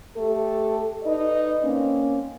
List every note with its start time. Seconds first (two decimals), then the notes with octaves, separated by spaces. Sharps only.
0.16 A3 G4 A4
1.03 D#4 B4 D5 D#5
1.63 A#3 C4 C#4